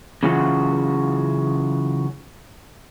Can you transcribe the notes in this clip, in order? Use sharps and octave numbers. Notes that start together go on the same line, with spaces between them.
C#3 E3 F#3 C#4 F4 F#4